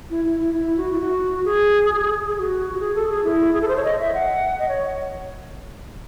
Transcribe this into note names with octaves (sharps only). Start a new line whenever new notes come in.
E4
E4
E4
E4
F#4
E4
F#4
G#4
G#4
F#4
F#4
G#4
A4
G#4
E4
G#4
A4
C5
C#5
D#5
E5
F#5
D#5
C#5